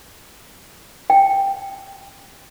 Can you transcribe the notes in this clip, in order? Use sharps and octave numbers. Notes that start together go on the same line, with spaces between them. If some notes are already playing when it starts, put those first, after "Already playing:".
G5